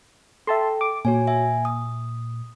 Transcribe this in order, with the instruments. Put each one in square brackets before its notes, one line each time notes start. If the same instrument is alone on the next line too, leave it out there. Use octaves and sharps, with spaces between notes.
[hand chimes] A4 G5 [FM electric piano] E5 A5 C6
[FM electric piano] D6
[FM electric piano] A#2 [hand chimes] F#4 C#5 G#5
[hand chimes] E5 G#5
D#6